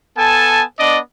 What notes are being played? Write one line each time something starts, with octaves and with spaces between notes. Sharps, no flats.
B3 A4 G#5 A5
B3 D4 D5 D#5